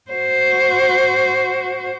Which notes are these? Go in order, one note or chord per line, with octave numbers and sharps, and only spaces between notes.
F#4 C5